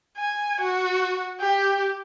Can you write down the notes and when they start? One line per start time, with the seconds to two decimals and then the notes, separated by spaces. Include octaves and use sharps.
0.17 G#5
0.61 F#4
1.40 G4